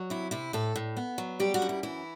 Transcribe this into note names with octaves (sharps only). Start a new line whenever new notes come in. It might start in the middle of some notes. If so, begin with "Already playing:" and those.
Already playing: F#3
C3 E4
C3 E4
A2 A4
A2
B3
F#3
G3 G4
F#4
F#2
E4
E3 E4